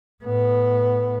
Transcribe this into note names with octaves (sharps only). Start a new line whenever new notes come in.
A2 B3